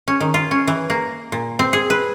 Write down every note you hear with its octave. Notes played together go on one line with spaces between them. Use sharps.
C#4
D#3
F4
C#4
E3
A#3
A#2
C4
G#4
B4